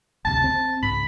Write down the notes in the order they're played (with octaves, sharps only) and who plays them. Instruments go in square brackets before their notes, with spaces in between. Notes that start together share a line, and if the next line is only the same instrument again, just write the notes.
[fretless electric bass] F#1 D2 C3 [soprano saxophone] A5
[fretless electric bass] C4
[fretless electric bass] C#2 G#2 [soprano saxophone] B5